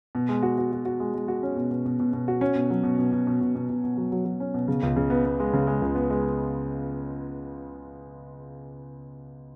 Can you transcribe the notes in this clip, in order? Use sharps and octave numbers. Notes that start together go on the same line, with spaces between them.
B2
G#3
F#4
F#4
F#4
F#4
G#3
G#3
F#4
C#4
B2
B2
B2
B2
B2
F#4
C#4
B2
F#3
B2
B2
B2
B2
B2
B2
B2
B2
F#3
F#3
F#3
C#4
B2
C#3
C#2
C#3
B3
B3
G#3
C#3
G#3
C#2
B3
G#3